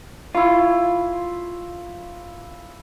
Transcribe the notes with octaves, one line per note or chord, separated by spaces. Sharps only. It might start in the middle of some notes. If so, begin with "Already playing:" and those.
E4 F4 C#6